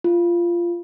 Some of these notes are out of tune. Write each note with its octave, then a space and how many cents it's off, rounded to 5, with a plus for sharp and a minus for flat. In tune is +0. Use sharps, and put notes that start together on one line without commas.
F4 -15